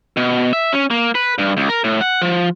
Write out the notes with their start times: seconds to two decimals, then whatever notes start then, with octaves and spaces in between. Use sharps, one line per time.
0.17 B2
0.53 E5
0.73 C#4
0.90 A#3
1.15 B4
1.38 G2
1.57 C#2
1.69 A#4
1.84 A2
2.01 F#5
2.22 F3